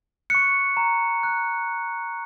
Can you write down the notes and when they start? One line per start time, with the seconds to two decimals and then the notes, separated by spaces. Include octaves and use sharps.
0.30 C#6 F#6 C#7
0.77 A#5
1.23 F#6